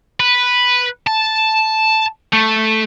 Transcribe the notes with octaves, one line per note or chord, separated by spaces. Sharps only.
B4
A5
A3